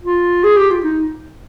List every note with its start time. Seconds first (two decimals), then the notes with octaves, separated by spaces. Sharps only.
0.03 F4
0.44 G#4
0.57 G4
0.71 F4
0.84 D#4